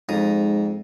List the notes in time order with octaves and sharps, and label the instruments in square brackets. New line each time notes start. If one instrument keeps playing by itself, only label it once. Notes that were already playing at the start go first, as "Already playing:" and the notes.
[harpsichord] F2 A#5 D#6 [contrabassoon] G#2